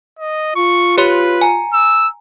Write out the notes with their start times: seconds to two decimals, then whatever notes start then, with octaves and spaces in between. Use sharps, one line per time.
0.19 D#5
0.56 F4 C#6
0.98 G4 B4 C#5 C6
1.41 G#5 A#5
1.73 E6